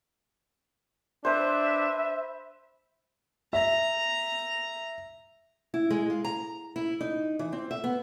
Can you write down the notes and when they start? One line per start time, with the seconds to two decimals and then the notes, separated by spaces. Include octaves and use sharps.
1.25 D4 B4 C5 E5
3.53 E5 A#5
5.74 E4
5.90 G#3
6.10 F4
6.24 A#5
6.76 E4
7.01 D#4
7.39 E3
7.53 C4
7.71 E5
7.84 B3